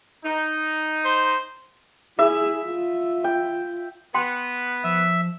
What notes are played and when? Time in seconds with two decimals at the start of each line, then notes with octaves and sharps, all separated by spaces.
0.25 D#4
1.04 C5
2.19 E4 G#4 E5
2.64 F4
3.24 G5
4.14 B3 G5 C6
4.84 F3 E5